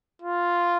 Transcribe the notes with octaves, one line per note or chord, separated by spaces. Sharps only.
F4